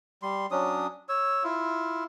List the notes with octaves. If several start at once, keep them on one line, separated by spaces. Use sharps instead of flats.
G3 C6
F#3 C#4 D4 D#6
C#5 E6
E4 F4